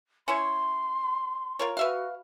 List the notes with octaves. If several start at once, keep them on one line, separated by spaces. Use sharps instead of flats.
C#4 E4 C#5 C6
F4 A#4 C#5
F#4 B4 E5 F5